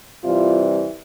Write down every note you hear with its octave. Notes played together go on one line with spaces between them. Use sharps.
C3 E3 G3 F4